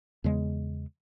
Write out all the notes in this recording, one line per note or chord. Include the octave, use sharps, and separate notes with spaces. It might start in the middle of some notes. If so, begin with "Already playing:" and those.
E2 C#3 G#3